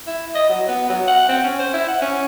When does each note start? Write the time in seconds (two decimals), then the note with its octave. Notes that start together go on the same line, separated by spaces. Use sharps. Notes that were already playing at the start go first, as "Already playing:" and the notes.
0.07 E4
0.35 D#5
0.49 F#3
0.68 B3
0.89 F#3
1.07 F#5
1.28 C4
1.44 C#4
1.59 C5
1.73 E4
1.88 F#5
2.01 C#4